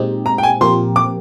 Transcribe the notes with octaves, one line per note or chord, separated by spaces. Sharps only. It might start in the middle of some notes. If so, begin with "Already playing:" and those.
Already playing: A#2 G#3 C4 D#4 G4
A#5
G5
G#5
A#2 F3 C4 G4 A#4 C6
D6